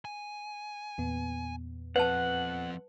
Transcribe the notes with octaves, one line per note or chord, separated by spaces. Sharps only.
G#5
E2 A#2 B3
F3 C4 B4 F#5 A5